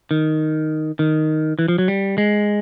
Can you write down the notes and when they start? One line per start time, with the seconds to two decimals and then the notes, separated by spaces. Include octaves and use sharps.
0.11 D#3
0.99 D#3
1.59 E3
1.68 F3
1.78 F#3
1.88 G3
2.18 G#3